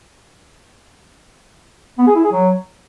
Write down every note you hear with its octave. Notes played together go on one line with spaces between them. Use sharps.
B3
G#4
E4
G#4
F#3